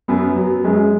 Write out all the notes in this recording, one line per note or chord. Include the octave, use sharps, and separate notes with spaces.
F#2 B3
F#3
F#2 G#3